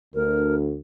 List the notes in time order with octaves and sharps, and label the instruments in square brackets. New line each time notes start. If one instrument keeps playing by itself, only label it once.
[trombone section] D2 [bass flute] A#4